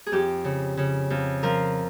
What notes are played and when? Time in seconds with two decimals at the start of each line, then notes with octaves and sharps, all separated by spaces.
0.07 G#4
0.12 F2 G4
0.44 C#3
0.77 C#3
1.10 F2
1.43 F3 A#4